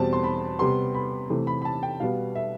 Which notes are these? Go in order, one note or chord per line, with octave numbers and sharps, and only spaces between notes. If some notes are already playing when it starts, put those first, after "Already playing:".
Already playing: E2 B2 G3 C4 A5
C6
B5
C3 G3 B3 C6
B5
C3 E3 A3
B5
B5
A5
G5
B2 G3 B3 F5
E5